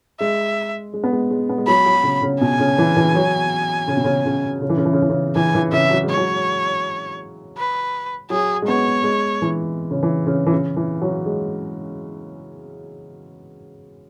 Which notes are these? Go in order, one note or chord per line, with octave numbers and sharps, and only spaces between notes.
G#3 E5
G#3
B3
G#3
G#3
B3
G#3
F#3 B5
F#3
C#3
C#3
B2 G#5
C#3
E3
E3
F#3
C#3
B2
C#3
C#3
C#3
E3
C#3
E3
C#3
E3
C#3
E3 G#5
E3
C#3 E5
F#3
G#3
C#5
F#3
B4
F#3 G#4
G#3
B3 C#5
G#3
E3
C#3
E3
C#3
E3
C#3
E3
F#3
G#3